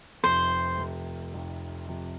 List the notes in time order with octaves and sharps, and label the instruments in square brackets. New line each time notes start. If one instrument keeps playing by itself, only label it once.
[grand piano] F1 F2 C3 [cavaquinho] C5
[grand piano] F1 F2 C3
F1 F2 C3
F1 F2 C3